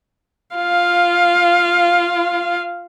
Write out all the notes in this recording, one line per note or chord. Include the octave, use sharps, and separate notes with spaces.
F4 F5